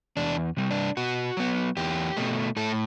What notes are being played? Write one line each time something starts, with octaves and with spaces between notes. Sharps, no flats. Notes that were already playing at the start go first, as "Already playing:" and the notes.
E2 D4
C3 G3
D4
B2 F#4
F#3 B3
E2 G4
B2 A3
A2 A4